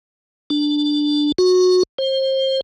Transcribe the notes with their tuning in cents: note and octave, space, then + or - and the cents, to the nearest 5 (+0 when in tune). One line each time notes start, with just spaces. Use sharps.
D4 +5
F#4 -20
C5 +30